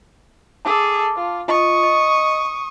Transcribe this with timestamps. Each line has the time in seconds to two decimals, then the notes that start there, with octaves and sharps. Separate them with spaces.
0.65 G#4 A4 A5 D6
1.16 F4
1.48 F4 D#5 C#6 D#6
1.83 D#5